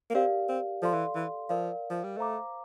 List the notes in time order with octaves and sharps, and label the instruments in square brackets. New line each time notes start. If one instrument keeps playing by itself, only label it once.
[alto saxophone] A#3
[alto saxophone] C4 [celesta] G4 A#4 D5 F5
[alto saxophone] C4
[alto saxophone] F3 [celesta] A4 D5 F5 C6
[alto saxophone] E3
E3
[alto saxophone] F3 [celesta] A#4 D5 F5
[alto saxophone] F3
G3
[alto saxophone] A3 [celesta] C5 F5 A#5 D6